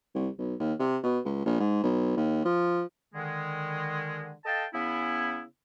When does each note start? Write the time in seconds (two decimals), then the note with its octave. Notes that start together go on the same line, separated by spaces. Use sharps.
0.15 C2
0.38 B1
0.60 D#2
0.79 C3
1.03 B2
1.25 C#2
1.45 A#1
1.60 G#2
1.83 B1
2.16 D#2
2.45 F3
3.15 D3 D#3 G#3
4.45 A4 D#5 F5 G5 A5
4.73 C#3 B3 C#4 E4